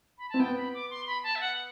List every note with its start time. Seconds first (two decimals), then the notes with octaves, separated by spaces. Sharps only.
0.18 B5
0.30 C4 A5
0.39 B3 G5
0.57 B5
0.74 D6
0.90 C6
1.07 B5
1.24 A5
1.35 E5
1.40 F#5